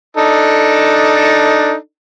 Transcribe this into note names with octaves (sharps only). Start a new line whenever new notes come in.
D4 D#4 A4